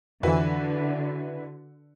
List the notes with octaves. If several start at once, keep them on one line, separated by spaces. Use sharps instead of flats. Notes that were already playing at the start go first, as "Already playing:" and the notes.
F2 D3 E3 E4 F#4 B4